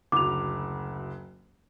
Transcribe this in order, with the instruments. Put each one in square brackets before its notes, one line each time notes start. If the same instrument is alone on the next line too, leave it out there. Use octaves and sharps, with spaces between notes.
[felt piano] F#1 D2 [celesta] D6 F7